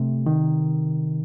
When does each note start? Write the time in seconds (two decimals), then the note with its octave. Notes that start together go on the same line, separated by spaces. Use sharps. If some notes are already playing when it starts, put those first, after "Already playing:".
Already playing: C3 A3
0.26 D#3